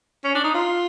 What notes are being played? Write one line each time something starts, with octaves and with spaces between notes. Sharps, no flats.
C#4
D4
D#4
F4